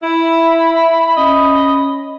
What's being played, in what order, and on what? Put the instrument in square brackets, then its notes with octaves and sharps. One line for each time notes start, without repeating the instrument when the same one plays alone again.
[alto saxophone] E4 [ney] E5 [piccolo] B5
[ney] C#4 [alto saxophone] D#5